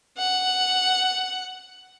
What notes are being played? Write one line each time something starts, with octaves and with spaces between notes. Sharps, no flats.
F#5